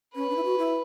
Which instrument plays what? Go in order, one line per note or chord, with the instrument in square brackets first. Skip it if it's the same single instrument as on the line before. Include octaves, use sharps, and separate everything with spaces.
[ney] C#4 [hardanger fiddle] B4
[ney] D4
E4
F#4
E4